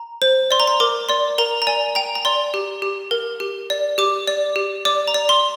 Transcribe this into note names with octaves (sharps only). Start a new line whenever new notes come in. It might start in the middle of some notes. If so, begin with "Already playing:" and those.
Already playing: A#5
C5
D5 C6
A#5
C6
A#4 D6
D5 C6
A#4 A#5
A#5
D5 G#5
G5 A#5
A#5
D5 C6
G4
G4
A#4
G4
D5
G4 D6
D5
G4
D5 D6
A#5
D5
C6